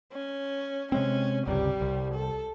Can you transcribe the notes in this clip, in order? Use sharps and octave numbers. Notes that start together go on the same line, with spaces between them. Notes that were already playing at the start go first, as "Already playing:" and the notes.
C#4
C3 G#3 C4 C#4
G1 C#2 C3 G3
C2
A4